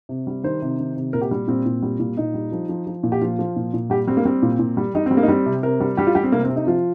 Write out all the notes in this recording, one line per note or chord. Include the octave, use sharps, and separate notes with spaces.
C3
G3
D#3 C5
C3
D#3
C3
A#2 A#4
G4
G3
A#2 C4
A#2
G3
A#2
A#2 D#4
G3
F3
F3
F3
A#2
G4
F3 F4
F3
A#2
A#2
G3 G4
G3 C4
A#3
G3 C4
A#2
A#2
G3
G3 D#4
C4
G3
A#3
D#4
G3 C4
C3
C3 A#4
G3
G3 G4
F4
G3 G4
C4
C3 A#3
C4
C3
D#4
F3 F4